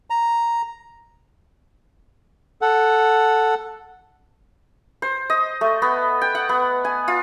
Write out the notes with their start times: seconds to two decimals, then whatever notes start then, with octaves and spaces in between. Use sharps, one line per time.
0.10 A#5
2.61 A4 F#5
5.02 C5
5.30 D#5
5.61 A3
5.82 B3
6.21 G5
6.35 F#5
6.49 B3
6.85 G#5
7.08 F4